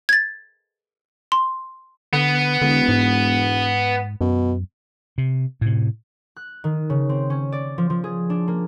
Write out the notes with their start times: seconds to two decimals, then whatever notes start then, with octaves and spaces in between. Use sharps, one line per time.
0.09 G#6 A6
1.32 C6
2.13 D3 B3
2.62 E1 D3
2.89 G#2
4.21 F#2 B2
5.18 C3
5.61 A2 C3
6.37 F#6
6.64 D#3
6.90 C#3
7.09 C4
7.30 C#4
7.52 D5
7.78 F3
7.90 F3
8.04 G#4
8.30 D4
8.48 A#3